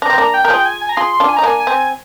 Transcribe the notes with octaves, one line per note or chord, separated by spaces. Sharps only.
D4 A#5
C4
A#3 D4
G5
A#4
F4 G#4
G#5
G#5
A#5
F4 G#4 C6
D4 F4
G#5
D#4 A#5
A#3 D4 G#5
G#5
C4